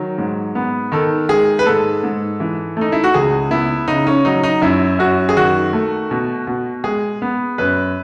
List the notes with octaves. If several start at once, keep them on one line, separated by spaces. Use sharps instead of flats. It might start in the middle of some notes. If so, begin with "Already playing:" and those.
Already playing: D#3 F#3
G#2
B3
D#3 A4
G#3 G#4
B4
G#2 A4
G#2
E3
A3 D#4
E4
F#4
C#2 G#4
B3 E4
C#3 D#4
C#4
F#3 D#4
D#4
F#2 E4
F#2 F#4
G#4
D#3 F#4
A3
B2
B2
G#3 G#4
B3
F#2 B4